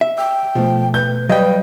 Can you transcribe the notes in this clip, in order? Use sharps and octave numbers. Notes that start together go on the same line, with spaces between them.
E5
G5 E6
B2 F3 A3
B4 G6
F#3 G3 B4 D#5 F5 G5